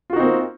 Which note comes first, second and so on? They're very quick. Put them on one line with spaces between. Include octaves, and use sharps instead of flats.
F4 F#4 D#4 C4 A#3